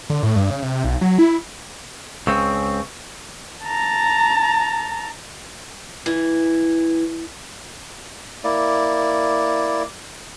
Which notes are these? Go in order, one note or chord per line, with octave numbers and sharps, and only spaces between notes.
D3
A2
G2
C#3
C3
B1
F#3
E4
C#2 C#3 C4 C#6 E6
A5 A#5
E3
A#3 E4 D5